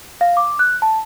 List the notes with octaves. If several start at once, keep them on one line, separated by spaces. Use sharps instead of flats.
F5
D6
F#6
A5